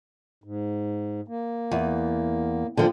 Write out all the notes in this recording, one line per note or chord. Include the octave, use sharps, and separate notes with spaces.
G#2
A#3
E2
D3 F3 A#3 G5